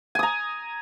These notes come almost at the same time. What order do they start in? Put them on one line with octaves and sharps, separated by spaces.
G#5 D#6 A#5